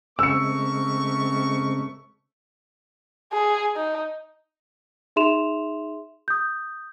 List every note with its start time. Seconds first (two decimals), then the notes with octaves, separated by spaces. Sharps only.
0.19 C#3 G#3 A3 C4 A#4 C#6 E6 C#7
3.33 G#4
3.76 D#4
5.16 D#4 G#4 E5 C6 E7 F7
6.28 D#6 G6